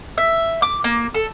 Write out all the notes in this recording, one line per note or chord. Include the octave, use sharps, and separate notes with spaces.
E5
D6
A#3
A4